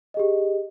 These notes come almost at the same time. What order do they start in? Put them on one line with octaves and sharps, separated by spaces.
D#5 G#4 G4